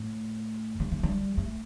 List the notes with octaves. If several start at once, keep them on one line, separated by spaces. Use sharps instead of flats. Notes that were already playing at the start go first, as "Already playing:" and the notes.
Already playing: A2
G3
A3
G3
A3